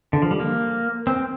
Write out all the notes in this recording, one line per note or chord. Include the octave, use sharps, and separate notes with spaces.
D3
F3
G3
A#3
C4